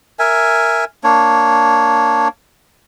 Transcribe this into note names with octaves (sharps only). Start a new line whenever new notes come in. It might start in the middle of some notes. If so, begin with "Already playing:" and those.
A#4 E5 G#5
A#3 D4 C#5